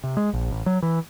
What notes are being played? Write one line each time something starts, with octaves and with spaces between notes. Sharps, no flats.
C3
G#3
A#1
A1
F#3
E3